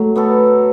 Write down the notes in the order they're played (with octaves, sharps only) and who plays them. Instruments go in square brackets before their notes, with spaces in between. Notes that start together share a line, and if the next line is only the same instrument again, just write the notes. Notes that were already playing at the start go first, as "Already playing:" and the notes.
Already playing: [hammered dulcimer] F#3 [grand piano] A3
[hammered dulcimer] B3 F#4 A4